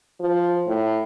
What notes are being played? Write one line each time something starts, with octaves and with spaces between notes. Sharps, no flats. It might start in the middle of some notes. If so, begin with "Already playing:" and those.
F3
A2